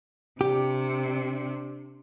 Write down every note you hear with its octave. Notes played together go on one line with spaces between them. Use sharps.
C3 D4 G4